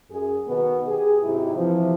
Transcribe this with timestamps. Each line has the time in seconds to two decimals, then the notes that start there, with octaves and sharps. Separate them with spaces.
0.11 F#2 G#4
0.48 B2 D#3 B3
0.87 G4 G#4
1.23 G#2 C3 F#3 D#4 E4 G4
1.55 C3 E3 F3